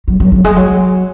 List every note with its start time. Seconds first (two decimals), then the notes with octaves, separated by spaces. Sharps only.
0.08 F#3
0.20 F#3
0.32 F#3
0.44 G#3
0.56 F#3